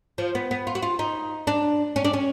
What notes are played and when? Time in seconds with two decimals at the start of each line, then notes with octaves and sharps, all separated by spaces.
0.18 F3
0.35 B3
0.51 B3
0.67 F4
0.75 F#4
0.82 F4
0.99 D#4
1.47 D4
1.96 C#4
2.05 D4
2.13 C#4